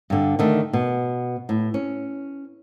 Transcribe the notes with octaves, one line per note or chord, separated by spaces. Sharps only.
G2 D3
D3 D#3 A3
B2
A2
C#4